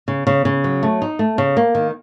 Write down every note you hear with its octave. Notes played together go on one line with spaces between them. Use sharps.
C#3
C#3
C#3
F#3
A3
D#4
A3
C#3
A#3
D#3